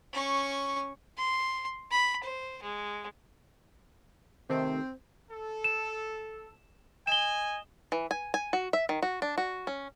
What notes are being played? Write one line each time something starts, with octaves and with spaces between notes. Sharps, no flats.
C#4 C#6
C6
B5
C5
G#3
C3 D#3 A3 C4
A4
E7
D#5 G#5 E7 G7
E3
G#5
G#5
F#4
E5
D#3
F#4
D4
F#4
C#4